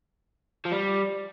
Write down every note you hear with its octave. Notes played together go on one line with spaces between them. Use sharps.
F3
G3